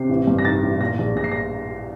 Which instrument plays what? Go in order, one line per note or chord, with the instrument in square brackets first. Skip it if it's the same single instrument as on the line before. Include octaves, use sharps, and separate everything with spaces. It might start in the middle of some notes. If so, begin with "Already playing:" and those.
Already playing: [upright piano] C3 C7
A1
G2
A#6
D#3 A6
A1
A#2 A#6
A#1
A#1 A#6
C7
A#6